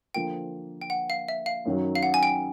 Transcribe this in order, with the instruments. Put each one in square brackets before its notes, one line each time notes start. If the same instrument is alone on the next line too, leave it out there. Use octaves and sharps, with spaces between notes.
[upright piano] D3 F3 A#3 [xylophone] G5
[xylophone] G5
F#5
F5
E5
F5
[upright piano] F#2 D#3 F#3
[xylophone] F5
F#5
G#5
G5